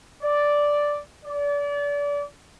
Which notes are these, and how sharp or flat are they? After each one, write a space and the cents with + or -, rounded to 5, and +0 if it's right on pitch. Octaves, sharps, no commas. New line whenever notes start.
D5 -5
D5 -30